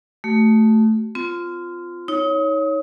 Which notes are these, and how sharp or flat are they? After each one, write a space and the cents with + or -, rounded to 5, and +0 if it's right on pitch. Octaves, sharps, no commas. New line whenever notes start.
A3 +0 F#4 +45
C4 -25 F4 +0
D#4 +30 C#5 +0 D#6 +5